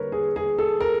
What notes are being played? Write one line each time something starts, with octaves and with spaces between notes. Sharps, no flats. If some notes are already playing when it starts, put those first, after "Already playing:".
Already playing: D3 G3 A#3 A#4 B4 C#5
G#4
G#4
A4
A#4